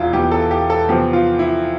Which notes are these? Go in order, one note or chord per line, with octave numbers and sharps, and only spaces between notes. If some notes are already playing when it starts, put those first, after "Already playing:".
Already playing: E1 E2 E3 E4 F4
E1 E2 E3 G4
A4
G4
A4
E2 C3 F3 C4 G4
F4
E4